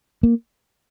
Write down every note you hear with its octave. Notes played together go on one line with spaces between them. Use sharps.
A#3